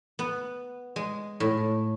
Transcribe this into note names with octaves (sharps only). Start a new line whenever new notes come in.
B3
G#3
A2